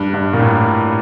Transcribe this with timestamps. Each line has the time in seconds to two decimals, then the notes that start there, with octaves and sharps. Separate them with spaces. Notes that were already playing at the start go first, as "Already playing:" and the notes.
Already playing: G2
0.14 G2
0.33 A#2
0.39 A2